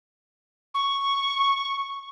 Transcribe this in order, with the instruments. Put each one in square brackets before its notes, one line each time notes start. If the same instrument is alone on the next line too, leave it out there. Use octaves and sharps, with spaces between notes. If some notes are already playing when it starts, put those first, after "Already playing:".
[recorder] C#6